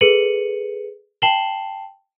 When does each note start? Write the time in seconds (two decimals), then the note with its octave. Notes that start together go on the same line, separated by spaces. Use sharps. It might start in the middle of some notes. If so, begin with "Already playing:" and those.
0.01 G#4 A4 B4 C#7 D#7 F#7
1.22 G5 A5 C7 E7 F#7 G7